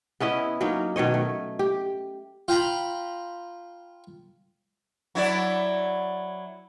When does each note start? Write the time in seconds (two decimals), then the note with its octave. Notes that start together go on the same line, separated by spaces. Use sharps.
0.20 B3 C#4 E4 D#5
0.61 F#3 A#3 C#4 D#4
0.96 B2 D#3 C#5 D#5
1.14 A3
1.59 G4
2.48 F4 G5 A#5 B5
5.15 F#3 E4 D5